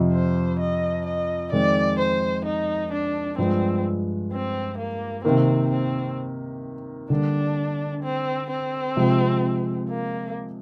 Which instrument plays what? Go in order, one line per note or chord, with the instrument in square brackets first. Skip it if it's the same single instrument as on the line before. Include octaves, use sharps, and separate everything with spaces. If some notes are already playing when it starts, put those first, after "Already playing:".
Already playing: [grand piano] F2 C3 F3
[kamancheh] C5
D#5
D#5
[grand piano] F2 D#3 G#3 C4 [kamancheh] D5
[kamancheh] C5
D#4
D4
[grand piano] G2 F3 G#3 [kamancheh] C4
[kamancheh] C4
A#3
[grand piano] C3 D#3 A#3 [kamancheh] C4
[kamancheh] C4
[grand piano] D3 G3 A#3 [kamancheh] D4
[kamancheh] C4
C4
[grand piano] C3 F3 G#3
[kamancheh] A#3